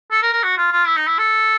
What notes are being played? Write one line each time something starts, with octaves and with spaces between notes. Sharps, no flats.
A4
A#4
A#4
F#4
F4
F4
E4
D#4
E4
A4